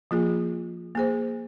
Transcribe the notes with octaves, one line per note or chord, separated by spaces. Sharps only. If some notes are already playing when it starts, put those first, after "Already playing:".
F3 A#3 F4 G#4
A#3 G#4 C5